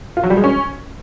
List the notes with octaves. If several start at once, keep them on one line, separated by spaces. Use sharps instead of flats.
F4
F#3
G3
G#3
C#4